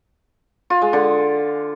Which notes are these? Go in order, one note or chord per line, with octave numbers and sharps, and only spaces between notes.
F4
G#3
D3